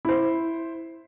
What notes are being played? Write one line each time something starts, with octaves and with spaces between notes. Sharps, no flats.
E4 C5